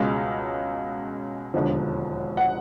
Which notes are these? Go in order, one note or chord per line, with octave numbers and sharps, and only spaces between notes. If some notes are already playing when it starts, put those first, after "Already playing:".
Already playing: C#2 B2 G#3 C#4 F5
E1 D#2 D3 F3
F#5